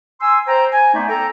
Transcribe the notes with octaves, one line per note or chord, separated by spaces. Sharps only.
G#5 C6 E6
C5 G5 A#5
G#5
A3 B3 D#4 C5 D5 E5
A4 G5 A#5